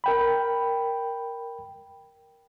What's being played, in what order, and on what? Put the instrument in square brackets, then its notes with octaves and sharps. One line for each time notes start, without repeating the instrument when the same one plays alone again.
[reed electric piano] A#4 G5 B5